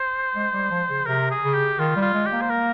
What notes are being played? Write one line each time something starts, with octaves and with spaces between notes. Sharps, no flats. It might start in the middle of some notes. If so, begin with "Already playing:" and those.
Already playing: C5
G#3
G3
F3
C#3
C3 A#4
G#4
C#3
G4
D#3 F4
G3
F4
G#3
G4
A#3
C5
A#4